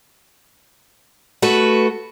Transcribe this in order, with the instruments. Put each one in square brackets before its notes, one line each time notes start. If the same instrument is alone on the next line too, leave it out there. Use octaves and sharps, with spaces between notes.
[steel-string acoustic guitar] A3 F#4 B4